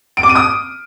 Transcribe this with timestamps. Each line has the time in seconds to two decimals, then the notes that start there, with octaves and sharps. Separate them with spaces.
0.17 D7
0.23 D6
0.29 D#7
0.35 D#6